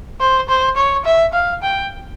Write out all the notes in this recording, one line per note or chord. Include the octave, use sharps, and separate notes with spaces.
C5
C5
C#5
E5
F5
G5